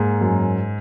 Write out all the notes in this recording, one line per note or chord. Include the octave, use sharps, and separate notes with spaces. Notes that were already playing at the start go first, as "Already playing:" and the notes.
Already playing: G#2 A#3
F#2